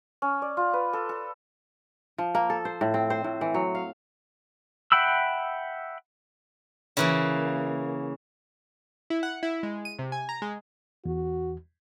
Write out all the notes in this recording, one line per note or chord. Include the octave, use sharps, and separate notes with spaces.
C#4
D5
F4
B4
A4
A4
F3
A#3
A4
C5
A2
C4
C5
A2
E3
F#3
F5
E5 F#5 G5 B5 E6
C#3 E3 A#3
E4
F#5
E4
G#3
D#7
C3
G#5
A#5
G#3
E2 F#4